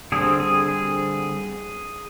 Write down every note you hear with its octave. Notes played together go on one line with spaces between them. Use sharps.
D3 G3 C4 G#4
G#4
G#4